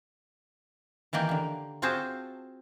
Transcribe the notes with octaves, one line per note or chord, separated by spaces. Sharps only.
D#3 E3 A#3 G4
D3 A#3
C4 F4 F#4 G#4 C5 A5